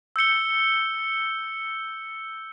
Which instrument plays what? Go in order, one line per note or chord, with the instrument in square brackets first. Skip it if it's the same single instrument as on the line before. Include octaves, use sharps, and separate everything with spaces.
[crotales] E6 G6 C#7 G7